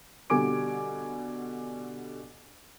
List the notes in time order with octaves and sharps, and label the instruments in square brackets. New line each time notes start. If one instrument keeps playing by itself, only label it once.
[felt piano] B2 D3 G3 G#5 D6 D7